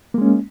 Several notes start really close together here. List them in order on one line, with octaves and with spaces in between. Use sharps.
A#3 G#3 C#4